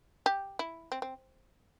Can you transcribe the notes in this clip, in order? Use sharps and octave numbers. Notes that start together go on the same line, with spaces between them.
G4
E4
C4
C4